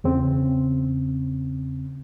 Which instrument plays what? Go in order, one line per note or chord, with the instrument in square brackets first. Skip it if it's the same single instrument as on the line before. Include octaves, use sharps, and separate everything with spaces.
[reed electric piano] E2 C#3 C4